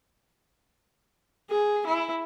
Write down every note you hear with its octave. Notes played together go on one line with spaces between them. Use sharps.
G#4
E4